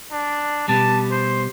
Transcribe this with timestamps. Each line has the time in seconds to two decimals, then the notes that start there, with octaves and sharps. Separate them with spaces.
0.12 D4
0.68 B2 G3 A5
1.11 C5